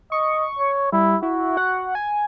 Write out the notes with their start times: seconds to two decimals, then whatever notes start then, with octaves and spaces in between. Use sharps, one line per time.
0.12 D#5 C#6
0.59 C#5
0.93 G3 E4
1.23 E4 F#4
1.57 F#5
1.95 G#5